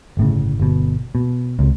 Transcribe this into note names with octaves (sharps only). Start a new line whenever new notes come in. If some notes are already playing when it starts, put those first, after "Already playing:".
G1 A2 C#3
G1 B2
B2
C#2 C3